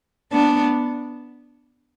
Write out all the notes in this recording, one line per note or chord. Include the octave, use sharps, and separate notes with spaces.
B3 D4